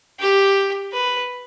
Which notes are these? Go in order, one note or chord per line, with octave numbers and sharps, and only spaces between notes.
G4
B4